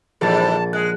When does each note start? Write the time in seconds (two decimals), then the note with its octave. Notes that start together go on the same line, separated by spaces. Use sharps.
0.21 A#1 G#2 E3 G3 G#4 A5 A6
0.73 G#3 G#4 F#6